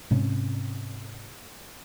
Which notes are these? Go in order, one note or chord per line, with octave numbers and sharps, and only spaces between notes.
G#2 C3 C4 C#4